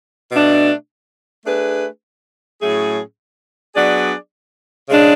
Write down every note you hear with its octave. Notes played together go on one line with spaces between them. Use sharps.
B2 A3 D4
A3 D4 G#4 B4
A2 F#3 A3 C#4 G#4
F#3 B3 D4 G#4 D5
C#3 G#3 D4